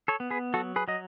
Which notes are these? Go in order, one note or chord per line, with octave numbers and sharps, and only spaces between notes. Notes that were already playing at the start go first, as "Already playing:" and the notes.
A4 C#5
B3
G#4 B4
F#3 F#4 A4
G#4 B4
F#3 D#5